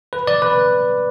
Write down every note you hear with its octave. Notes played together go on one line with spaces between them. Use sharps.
B4
D5
B4